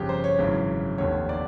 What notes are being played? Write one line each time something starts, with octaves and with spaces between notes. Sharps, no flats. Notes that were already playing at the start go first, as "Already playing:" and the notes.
Already playing: G1 F2 C#3 G4
C5
C#5
G#1 F#2 C#3 E3
F1 D#2 D3 C#5
D5